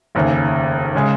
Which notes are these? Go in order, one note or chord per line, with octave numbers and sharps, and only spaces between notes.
F1 D#2 C#3
C#3 G#3